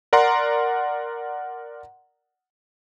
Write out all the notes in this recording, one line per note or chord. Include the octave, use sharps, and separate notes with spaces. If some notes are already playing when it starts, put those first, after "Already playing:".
A#4 D5 F#5 A#5 C6